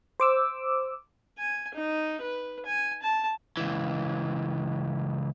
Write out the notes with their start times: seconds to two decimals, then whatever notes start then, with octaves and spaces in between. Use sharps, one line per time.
0.20 C5 D6 E6
1.38 G#5
1.74 D#4
2.22 B4
2.66 G#5
3.02 A5
3.57 C#2 E3